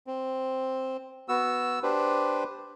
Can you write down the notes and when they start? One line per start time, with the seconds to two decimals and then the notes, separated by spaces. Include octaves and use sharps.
0.07 C4
1.29 B3 F#4 E6
1.83 D4 G4 B4 C5